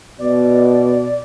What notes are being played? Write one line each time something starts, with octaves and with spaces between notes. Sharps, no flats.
B2 D5